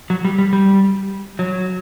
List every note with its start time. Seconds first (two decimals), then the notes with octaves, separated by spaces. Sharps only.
0.10 F#3
0.25 G3
0.38 G3
0.53 G3
1.39 F#3